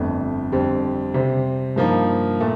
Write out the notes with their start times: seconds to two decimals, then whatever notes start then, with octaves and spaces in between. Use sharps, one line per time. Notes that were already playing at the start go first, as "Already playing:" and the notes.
Already playing: G1 F2 D3 A3
0.52 F2 D3 G3 C4
1.14 C3 G3 C4
1.76 G2 F3 A#3 D#4
2.40 A#2 A3